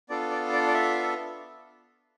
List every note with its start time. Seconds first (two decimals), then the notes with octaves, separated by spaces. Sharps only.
0.09 B3 D4 F4 A4 D5
0.31 D5
0.53 D5
0.67 D5
0.74 E5